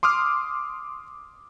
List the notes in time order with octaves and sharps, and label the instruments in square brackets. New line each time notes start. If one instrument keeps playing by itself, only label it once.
[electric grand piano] C6 D6 D#6 F6